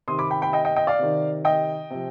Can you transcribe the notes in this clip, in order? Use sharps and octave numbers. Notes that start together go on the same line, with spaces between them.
C3 D#3 C6 D#6
B5 D6
G5 B5
G5 B5
D#5 G5
D#5 G5
D#5 G5
D5 F5
C3 D#3
D#5 G5
C3 F3